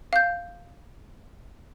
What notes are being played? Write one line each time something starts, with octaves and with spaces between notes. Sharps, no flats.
F5 G6